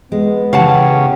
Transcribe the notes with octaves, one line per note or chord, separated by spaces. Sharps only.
G#3 B3
C#3 E3 G4 F5 F#5 A5